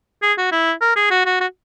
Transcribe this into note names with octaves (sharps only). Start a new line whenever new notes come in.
G#4
F#4
E4
A#4
G#4
F#4
F#4
F#4